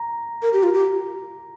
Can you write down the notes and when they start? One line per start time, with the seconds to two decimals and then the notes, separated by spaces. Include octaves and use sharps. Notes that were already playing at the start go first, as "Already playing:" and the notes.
Already playing: A#5
0.42 A#4
0.53 G4
0.63 F4
0.74 G4